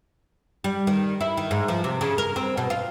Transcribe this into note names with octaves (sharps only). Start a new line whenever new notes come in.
G3
D#3
E4
D#3
G#2
F3
C3
C#3
A#4
C4
B2
F4